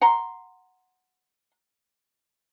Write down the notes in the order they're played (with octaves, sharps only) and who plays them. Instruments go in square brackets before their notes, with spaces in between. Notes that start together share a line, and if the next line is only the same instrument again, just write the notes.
[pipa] F#5 A#5 C6